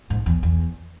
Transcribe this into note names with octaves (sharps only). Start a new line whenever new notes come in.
G#2
E2
E2